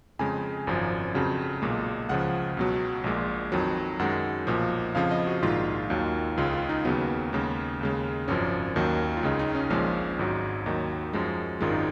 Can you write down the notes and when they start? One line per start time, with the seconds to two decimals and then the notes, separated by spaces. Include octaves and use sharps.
0.19 F2 C#3 G#3 G#5
0.67 G#1 F#2 F3
1.14 F2 C#3 F#3
1.62 B1 A#2 G#3
2.09 C#2 C#3 F3 F#5
2.57 C#2 B2 F#3
3.04 A#1 A#2 G#3
3.52 F2 D#3 F#3
3.99 F#2 D#3 G#3 F#5
4.47 B1 A#2 F3
4.95 F2 C#3 F3 F5
5.11 D#5
5.27 F#4
5.42 A#1 G#2 D#3 G#3 F4
5.90 D#2 D#3 F#3
6.37 C#2 C#3 G#3 F4
6.53 F4
6.69 D#4
6.85 D#2 C#3 F#3 B3
7.33 D#2 C#3 G#3
7.81 D#2 C#3 G#3
8.28 G#1 F#2 F3 C#4
8.76 D#2 D#3 F#3
9.17 F4
9.23 C#2 C#3 G#3 D#4
9.39 D#4
9.55 C#4
9.70 A#1 A#2 F3 G#3 C#4
10.19 G#1 G#2 F#3
10.66 D#2 D#3 F#3 D#4
11.13 F#2 F3 G#3
11.61 G#1 F#2 D#3 G#3 F4
11.71 D#4